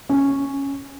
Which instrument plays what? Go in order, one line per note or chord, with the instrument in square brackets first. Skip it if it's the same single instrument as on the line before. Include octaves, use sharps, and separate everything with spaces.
[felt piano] C#4